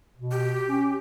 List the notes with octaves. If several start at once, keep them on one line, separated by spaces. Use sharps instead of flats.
B2
G4
C#4